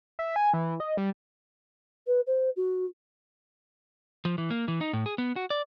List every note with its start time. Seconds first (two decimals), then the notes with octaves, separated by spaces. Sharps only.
0.19 E5
0.36 G#5
0.54 E3
0.80 D#5
0.97 G3
2.07 B4
2.27 C5
2.56 F#4
4.25 F3
4.38 E3
4.50 A#3
4.68 E3
4.81 D#4
4.93 A2
5.06 G#4
5.18 B3
5.36 F#4
5.50 D5